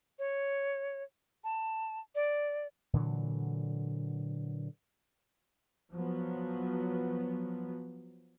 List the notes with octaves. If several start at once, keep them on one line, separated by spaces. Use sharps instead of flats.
C#5
A5
D5
A#2 D3 E3 F#3
F3 F#3 B3